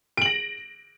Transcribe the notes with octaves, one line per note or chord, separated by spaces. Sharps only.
A#6 D7 F#7